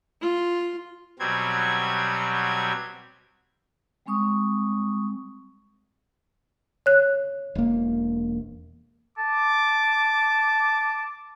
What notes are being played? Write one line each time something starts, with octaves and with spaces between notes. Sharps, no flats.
F4
B2 F#3 G3 C4 G#6
G3 G#3 C4 C#6 D#6
C#5 F#6
E1 A#3
A5 D6